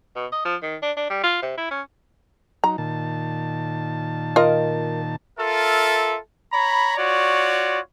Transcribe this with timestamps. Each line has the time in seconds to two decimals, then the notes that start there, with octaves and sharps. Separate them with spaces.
0.16 B2
0.32 D#5
0.45 F3
0.62 D#3
0.83 D4
0.97 D4
1.10 G3
1.23 F4
1.42 C3
1.57 E4
1.71 C#4
2.64 F#3 D#4 A#5
2.78 A#2 D#3 A5
4.36 F4 A#4 D#5
5.39 F4 A4 A#4 E5
6.53 C#5 A#5 B5
6.96 F4 F#4 C#5 D5